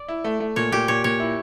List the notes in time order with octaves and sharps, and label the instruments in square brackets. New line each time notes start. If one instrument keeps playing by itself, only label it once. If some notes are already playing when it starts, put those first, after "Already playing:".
Already playing: [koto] D5
[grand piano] E4
A3
A3
[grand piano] A#2 [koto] C#5
[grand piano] A#2 [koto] G4
[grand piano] A#2 [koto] C#5
[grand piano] A#2 [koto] C#5
[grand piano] E4